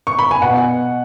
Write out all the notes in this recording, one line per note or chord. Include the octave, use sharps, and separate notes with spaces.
C#6
B5
G#5
B2 F#5